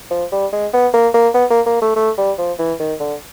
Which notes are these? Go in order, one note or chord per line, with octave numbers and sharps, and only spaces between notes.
F3
G3
G#3
B3
A#3
A#3
B3
A#3
A#3
A3
A3
G3
F3
E3
D#3
D3